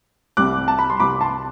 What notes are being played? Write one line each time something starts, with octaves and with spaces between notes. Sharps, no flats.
C2 C3 G3 D6 F#6
A5
B5
C6
C2 C3 G3 B5 D6
A5 C6